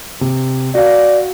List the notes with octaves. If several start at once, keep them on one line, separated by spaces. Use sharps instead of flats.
C3
F#4 D5 F5